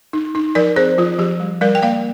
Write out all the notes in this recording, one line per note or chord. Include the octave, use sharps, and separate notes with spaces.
D#4
D#4
F3 A#4 D5
C4 G#4 C5
F3 F4
F3 G4
G3
G3 A#4 D5
G5
A#3 D5 F5